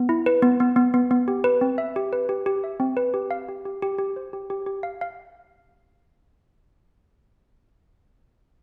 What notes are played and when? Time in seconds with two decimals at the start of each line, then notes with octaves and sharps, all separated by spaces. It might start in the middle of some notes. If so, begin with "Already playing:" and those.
Already playing: B3
0.09 E4
0.26 B4
0.42 B3
0.60 B3
0.76 B3
0.94 B3
1.11 B3
1.28 G4
1.44 B4
1.61 C4
1.78 E5
1.96 G4
2.13 B4
2.29 G4
2.46 G4
2.64 E5
2.80 C4
2.97 B4
3.14 G4
3.31 F5
3.48 G4
3.65 G4
3.82 G4
3.98 G4
4.16 C5
4.33 G4
4.50 G4
4.66 G4
4.83 F5
5.01 F5